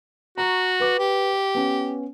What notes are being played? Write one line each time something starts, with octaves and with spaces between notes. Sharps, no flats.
F#4 A#5 C#6
B4 D6
G4
B3 C#4